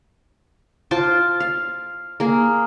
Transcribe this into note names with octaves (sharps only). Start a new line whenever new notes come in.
F4 C5 A5 D6
F5
A#3 G#4